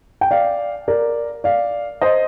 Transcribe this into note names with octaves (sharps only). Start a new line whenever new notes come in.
G5
D5 F5
A#4 D5
D5 F5
C5 D#5